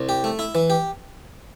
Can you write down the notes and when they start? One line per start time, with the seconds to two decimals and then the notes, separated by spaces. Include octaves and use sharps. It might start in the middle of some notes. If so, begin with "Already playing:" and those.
Already playing: C2
0.09 G4
0.24 A3
0.39 E4
0.55 E3
0.70 G4